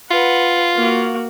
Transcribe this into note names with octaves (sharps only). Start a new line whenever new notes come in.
F4 B4 F#5
A#3 F#4